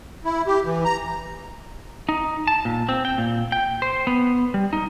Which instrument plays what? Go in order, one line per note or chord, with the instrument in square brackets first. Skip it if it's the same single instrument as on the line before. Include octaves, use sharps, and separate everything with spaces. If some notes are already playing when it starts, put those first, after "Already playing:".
[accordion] E4
G4
E3
A#5
[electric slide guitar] D#4
A5
A#2
C4
G5
A#2
G5
C5
B3
G3
D#4